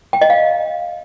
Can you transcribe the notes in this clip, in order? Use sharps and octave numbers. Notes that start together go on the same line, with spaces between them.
G5
D#5
F5